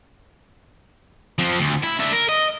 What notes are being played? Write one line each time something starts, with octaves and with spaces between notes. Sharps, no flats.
F3 C4
D2
E4
D4 E5
A#4
D#5